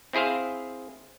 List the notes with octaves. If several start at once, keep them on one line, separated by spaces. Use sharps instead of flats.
C4 E4 G#4 C5 F5